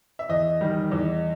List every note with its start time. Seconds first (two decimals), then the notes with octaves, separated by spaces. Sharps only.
0.19 E5
0.29 E2 D#5
0.61 D#3 G3
0.92 E2